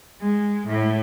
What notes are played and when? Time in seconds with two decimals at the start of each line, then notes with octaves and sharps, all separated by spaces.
0.20 G#3
0.67 A2